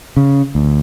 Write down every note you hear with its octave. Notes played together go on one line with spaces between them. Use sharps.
C#3
D2